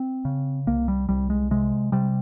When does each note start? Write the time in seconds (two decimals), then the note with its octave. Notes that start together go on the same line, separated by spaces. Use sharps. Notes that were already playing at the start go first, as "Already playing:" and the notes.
Already playing: C4
0.25 C#3
0.67 C2 A#3
0.88 G3
1.09 C2 G3
1.30 G#3
1.51 C3 G#3
1.92 C3 G3